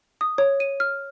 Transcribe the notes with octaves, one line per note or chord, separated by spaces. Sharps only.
D#6
C#5
D#7
F6